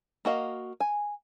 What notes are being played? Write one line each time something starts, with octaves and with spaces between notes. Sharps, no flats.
A#3 F#4 D#5 F5
G#5